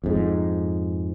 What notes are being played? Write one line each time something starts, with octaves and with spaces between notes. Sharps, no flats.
F2 G#2